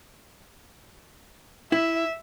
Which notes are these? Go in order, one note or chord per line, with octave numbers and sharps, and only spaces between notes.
E4 E5